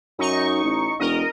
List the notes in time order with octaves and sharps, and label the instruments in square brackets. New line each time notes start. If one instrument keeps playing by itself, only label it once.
[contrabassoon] F#2 [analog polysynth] D#4 C#6
[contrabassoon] A1
[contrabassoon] E1 [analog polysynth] A#4 D#5